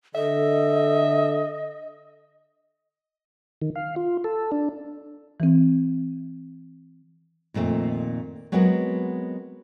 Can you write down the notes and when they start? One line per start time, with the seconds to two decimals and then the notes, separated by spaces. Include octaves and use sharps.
0.15 D3 A4 D#5 E5
3.62 D#3
3.76 F5
3.96 F4
4.24 A4
4.52 D4
5.40 E3 C4
7.54 F2 A#2 D#3 A3 C4
8.52 F#3 G#3 B3 C4 F#4 A#4